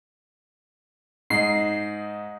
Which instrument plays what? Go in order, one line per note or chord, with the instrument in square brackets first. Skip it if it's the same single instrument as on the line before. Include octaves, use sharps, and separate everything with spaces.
[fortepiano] G#2 D#4 [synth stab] C7